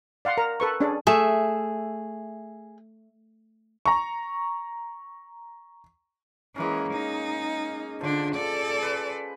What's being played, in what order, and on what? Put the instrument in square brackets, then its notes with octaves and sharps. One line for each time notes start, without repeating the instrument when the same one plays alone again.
[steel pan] D5 F5 F#5 C6
A#4 A#5
A4 B4 C#6
C#4 D4 G#4 D5
[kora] A3 E5 [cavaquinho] G#4
[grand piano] A#5 C#6
[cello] E3 [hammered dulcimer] G#3 A#3 C#4
[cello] D#4
[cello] D3 D4 [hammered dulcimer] F3
[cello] A4 D5
[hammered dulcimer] B4